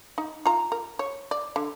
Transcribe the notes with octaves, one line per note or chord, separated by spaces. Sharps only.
D#4
F4 A#5
A#4
C#5
D5
D3